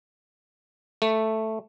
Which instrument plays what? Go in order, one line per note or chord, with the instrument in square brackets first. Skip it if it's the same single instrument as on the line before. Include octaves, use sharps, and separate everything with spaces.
[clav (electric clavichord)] A3